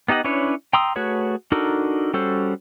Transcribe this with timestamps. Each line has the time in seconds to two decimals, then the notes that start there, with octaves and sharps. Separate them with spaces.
0.08 B3 D#4 G4 D#5 F#5
0.24 C#4 D4 E4 B4 C#5
0.73 G5 A#5 C6 D#6 E6
0.96 A3 F#4 G#4 B4 C#5
1.52 D4 D#4 F#4 A4 A#4
2.14 G3 C#4 F#4 A4 C5